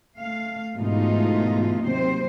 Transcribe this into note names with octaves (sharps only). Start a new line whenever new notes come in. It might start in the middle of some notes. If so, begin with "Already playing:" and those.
A3 F5
G#2 B2 E3 A3 D#4 F4
D#2 C3 F#3 C4 C5